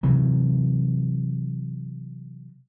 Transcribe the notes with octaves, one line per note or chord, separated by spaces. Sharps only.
C3 E3 F#3